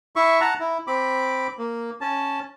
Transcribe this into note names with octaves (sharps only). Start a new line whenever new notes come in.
E4 E5 C#6
F#5 A5 A#5
E4
C4 B5 D6
A#3
C#4 A5